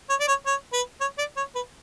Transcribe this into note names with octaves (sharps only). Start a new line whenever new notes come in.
C#5
D5
C#5
C#5
B4
C#5
D5
C#5
B4